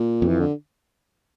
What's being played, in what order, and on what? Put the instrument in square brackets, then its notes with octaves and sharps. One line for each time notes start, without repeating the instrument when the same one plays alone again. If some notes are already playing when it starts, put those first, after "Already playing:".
Already playing: [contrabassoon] A#2
[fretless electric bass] F2
[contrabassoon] E3
D3